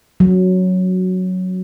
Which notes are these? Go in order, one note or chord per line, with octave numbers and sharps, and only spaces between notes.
F#3